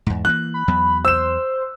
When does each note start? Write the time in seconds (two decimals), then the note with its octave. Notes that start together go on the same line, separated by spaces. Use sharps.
0.06 E2 G#2
0.25 E3 G#3 A#3 F#6
0.54 B5
0.68 E2 F#3 B3
1.05 C5 E6 E7